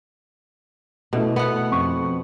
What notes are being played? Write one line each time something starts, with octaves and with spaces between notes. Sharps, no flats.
B2 A3 E4 A4
B3 F#5
F2 C#6